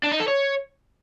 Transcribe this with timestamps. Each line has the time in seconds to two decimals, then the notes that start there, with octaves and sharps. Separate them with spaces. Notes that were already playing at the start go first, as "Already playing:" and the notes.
0.04 D4
0.12 D#4
0.20 A4
0.28 C#5